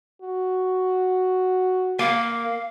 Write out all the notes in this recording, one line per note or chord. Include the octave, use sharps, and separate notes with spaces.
F#4
A#3 F5